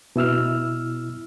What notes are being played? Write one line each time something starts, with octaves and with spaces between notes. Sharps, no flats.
B2 E4 E6 F6